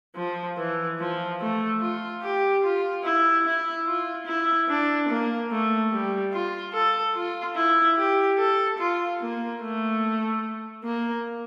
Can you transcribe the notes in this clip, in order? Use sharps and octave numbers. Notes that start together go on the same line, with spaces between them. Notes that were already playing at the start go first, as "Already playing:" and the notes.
F3
E3
F3
A3
F4
G4
F4
E4
E4
F4
E4
D4
A#3
A3
G3
F4
A4
F4
E4
G4
A4
F4
A#3
A3
A#3